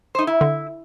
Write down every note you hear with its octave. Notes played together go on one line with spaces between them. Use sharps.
D#4 C5
E4
D3